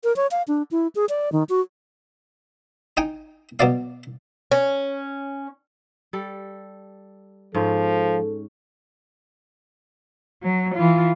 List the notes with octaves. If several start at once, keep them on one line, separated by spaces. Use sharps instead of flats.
A#4
C#5
F5
D4
E4
G#4
D5
D#3
F#4
D#4 G5 G#5
B2 F#3 D5 F5
C#4
G3 A4
G#2 F3 C#4 A4 C5
F#3
E3 F4